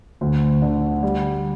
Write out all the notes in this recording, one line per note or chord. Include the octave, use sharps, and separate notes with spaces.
D2
D3
G3